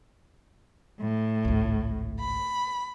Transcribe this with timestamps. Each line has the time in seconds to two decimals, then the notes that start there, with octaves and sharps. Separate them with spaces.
0.98 A2
1.45 G#1 C#2
2.20 B5